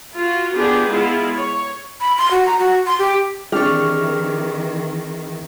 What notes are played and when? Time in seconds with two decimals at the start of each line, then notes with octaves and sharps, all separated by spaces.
0.15 F4 F#4
0.54 B3 D4 F4 G4 G#4
0.88 G#3 B3 E4 F4
1.35 C#5
2.01 B5
2.18 C6
2.31 F#4
2.46 A#5
2.59 F#4
2.87 C6
2.99 G4
3.52 D#3 E3 C4 D4 G4 G#4 C#6 F6